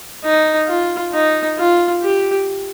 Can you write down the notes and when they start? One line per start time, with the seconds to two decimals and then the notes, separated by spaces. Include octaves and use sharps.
0.25 D#4
0.68 F4
1.13 D#4
1.58 F4
2.02 G4